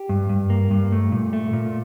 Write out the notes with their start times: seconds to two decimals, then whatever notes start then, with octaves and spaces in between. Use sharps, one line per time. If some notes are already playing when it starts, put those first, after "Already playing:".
Already playing: G4
0.09 G2
0.29 G2
0.50 A#3
0.71 G2
0.92 A3
1.12 A#2
1.33 A3
1.53 A#2